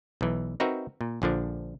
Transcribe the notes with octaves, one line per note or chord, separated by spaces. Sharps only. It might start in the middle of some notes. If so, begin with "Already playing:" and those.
B1 E3
C4 D#4 F#4 A#4 B4 E5
A#2
A#1 D3 F3 D4